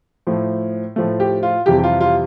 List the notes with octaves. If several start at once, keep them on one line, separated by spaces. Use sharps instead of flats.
A2 F3 A3
A2 F3 A3
G4
F4
F2 C3 E3 G3 G4
G4
F4
F4